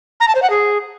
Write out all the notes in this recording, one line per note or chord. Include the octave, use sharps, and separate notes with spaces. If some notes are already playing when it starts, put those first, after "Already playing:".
A#5
A5
C5
F#5
G#4